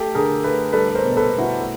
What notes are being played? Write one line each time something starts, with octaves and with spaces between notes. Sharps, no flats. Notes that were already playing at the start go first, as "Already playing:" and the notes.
Already playing: A3 G4 A4
D3 G#4 A#4
A3 A4 B4
G3 A4 B4
B4
A#4 C5
B2
A4 B4
B2
E4 F#4
A3